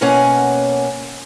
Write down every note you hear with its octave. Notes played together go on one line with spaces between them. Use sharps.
B2 A#3 C#4 F#5 G#5